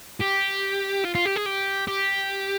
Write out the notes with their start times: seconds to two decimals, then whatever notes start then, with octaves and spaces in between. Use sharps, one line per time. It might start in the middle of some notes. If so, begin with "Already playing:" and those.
0.21 G4
1.05 F4
1.15 F4
1.26 G4
1.36 G#4
1.46 G4
1.88 G4